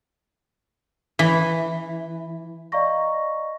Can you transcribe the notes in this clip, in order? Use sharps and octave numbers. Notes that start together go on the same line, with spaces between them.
E3
D5 D#5 F5 A#5 C#6 A#6